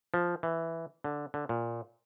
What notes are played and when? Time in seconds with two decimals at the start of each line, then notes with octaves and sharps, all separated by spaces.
0.14 F3
0.43 E3
1.04 D3
1.34 D3
1.49 A#2